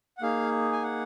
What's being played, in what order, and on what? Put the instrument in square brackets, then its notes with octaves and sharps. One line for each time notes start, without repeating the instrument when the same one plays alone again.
[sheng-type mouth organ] F#5
A#3 D#4 G#4 F5
G#5
F#5